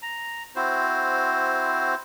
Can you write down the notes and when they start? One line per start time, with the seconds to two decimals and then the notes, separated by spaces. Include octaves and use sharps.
0.02 A#5
0.56 C4 E4 F#4 C5